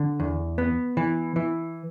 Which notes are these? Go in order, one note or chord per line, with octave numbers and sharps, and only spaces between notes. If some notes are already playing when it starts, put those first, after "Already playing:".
Already playing: D3
E2
B3
E3
E3